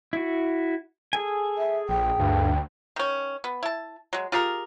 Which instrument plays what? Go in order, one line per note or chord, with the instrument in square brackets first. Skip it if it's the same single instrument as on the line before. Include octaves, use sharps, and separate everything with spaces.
[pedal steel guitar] E4 F#4
G#4 A4 G#5
[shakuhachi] E5
[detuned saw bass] A#1 [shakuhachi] G5
[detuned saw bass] D2 [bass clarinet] G2
[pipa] D#3 C#4
B3
E4 A5
F#3 G#3
F4 G4 G#4 A#4